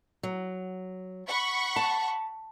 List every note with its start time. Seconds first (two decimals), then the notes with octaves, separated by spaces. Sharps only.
0.23 F#3
1.27 F#5 B5 C#6
1.76 A5